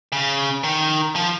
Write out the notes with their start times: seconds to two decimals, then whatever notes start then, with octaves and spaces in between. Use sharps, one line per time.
0.12 C#3
0.64 D#3
1.16 F3